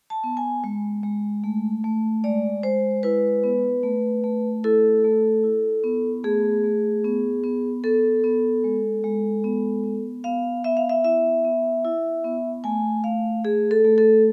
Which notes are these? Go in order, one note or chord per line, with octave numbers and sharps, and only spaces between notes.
A5
B3
G#5
G#3
G#3
A3
A3
G#3 D5
G#3 C5
E4 B4
B3
A3
A3
E4 A4
A3
E4
B3
A3 G#4
A3
B3
B3
B3 A4
B3
G#3
G#3
B3
B3
B3 F5
B3 E5
F5
E5
E4 E5
B3
E4
B3
A3 G#5
A3 F5
A3 G#4
A4
A3
A4